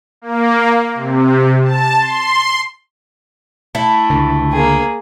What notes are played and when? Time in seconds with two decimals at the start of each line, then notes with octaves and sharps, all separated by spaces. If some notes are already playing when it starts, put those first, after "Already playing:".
0.22 A#3
0.95 C3
1.64 A5
1.99 C6
3.75 A3 E4
4.10 C#2 D3
4.52 A#3 G#4